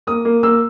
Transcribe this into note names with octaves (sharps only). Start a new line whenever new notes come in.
A#3 D#6
A#3
A#3 E6